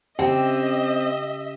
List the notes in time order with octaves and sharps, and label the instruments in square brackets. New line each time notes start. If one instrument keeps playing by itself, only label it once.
[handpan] C#3 G4 [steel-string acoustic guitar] C4 [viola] D#5 E5 [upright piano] G5